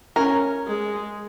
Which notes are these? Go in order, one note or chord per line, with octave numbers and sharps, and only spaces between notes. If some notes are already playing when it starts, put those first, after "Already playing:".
C#4 A#4
G#3